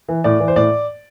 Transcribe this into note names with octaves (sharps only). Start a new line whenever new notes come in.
E3
A2 D5
E3
C5
A2 D5